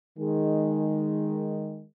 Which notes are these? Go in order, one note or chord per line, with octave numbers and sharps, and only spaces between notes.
D#3 G#3